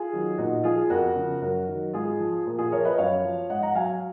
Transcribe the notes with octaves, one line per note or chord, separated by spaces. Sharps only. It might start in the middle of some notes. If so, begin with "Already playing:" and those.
Already playing: F4 G#4
D#3 F#3
A#2 D#4 F#4
F3 F4 G#4
F2 F#4 A#4
C#3 F3
F#2 F#4 A#4
D#3 F#3
G#2 F4 G#4
F3
A#2
F4 G#4
F3 A#4 C#5
B4 D#5
F#2 C#5 F5
F3
G#2 D#5 F#5
F#5 A#5
F#3 F5 G#5